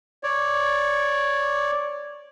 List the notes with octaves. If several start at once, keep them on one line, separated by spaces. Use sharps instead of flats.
C#5 D5